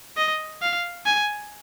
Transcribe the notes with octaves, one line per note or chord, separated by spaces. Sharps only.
D#5
F5
G#5